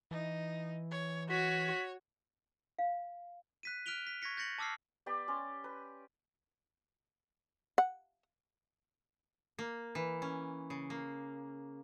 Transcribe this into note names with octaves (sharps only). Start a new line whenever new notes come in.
E3 D#4
C#5
F#4 C#5 B6
F5
F#6 B6 D#7
F6 F#6 B6 D7 F7 G7
B6
C#6 G#6 A#6 B6 C#7
G6 A6 A#6 C#7 F#7
A5 D6 E6 F6 C7
B3 G4 D5 B5
C#4 D5 C6
B4
F#5
A#3
E3
C#4
C#3
A#3